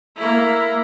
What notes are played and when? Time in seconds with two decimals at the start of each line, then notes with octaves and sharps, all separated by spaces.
0.16 A#3 E4